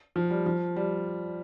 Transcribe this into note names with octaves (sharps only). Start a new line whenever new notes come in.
F3
G3
F3
G3